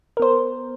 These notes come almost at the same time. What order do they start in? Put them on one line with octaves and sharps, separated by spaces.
A#4 B3 C5